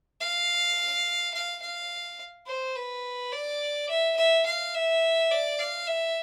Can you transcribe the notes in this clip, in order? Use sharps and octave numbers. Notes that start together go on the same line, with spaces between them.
F5
F5
F5
C5
B4
D5
E5
E5
F5
E5
D5
F5
E5